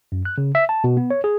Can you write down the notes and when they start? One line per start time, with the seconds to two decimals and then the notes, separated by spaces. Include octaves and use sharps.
0.12 F#2
0.25 F#6
0.38 C#3
0.55 E5
0.69 A5
0.84 B2
0.97 B3
1.11 C#5
1.24 G#4